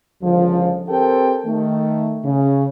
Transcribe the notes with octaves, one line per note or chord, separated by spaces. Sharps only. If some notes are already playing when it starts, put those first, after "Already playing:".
C#2 D3 F3
C4 G4 A4 A#4 G5
D#3 A3
C#3